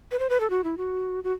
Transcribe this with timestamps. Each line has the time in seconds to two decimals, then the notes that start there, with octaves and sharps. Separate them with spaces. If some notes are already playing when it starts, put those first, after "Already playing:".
0.11 B4
0.19 C5
0.29 B4
0.40 A4
0.50 F#4
0.64 E4
0.77 F#4
1.24 F#4